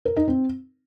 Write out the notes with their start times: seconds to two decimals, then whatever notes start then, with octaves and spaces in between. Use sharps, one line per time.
0.05 A#4
0.17 D#4
0.28 C4